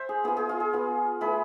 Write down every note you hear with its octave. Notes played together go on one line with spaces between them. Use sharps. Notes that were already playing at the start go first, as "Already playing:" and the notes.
Already playing: C5 E5
G#4
B3 F4 G#4
G#4
F4
G#4
B3 F4
A3 E4 G#4 B4